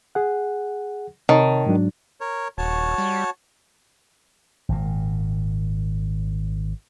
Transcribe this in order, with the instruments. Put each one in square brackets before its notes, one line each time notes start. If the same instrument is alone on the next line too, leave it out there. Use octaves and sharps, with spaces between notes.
[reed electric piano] G#4 F#5
[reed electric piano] C3 C#5 A5 [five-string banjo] D#3
[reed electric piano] G#2 F#3 D4
[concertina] A#4 C#5
[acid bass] D#1 [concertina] F#4 C#5 A5
[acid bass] G3
[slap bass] G#1 A#2